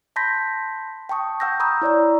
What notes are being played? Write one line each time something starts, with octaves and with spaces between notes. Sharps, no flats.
A5 B5 C6 G6 A#6 B6
G5 A5 C#6 D#6
F#5 G5 E6 G6 A#6
A#5 B5 C#6 D#6 E6 G6
E4 C#5 D5 A#5